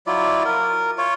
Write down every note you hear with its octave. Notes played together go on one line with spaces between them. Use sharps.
F#3 E4 F4 D5
A#4
F4 C#5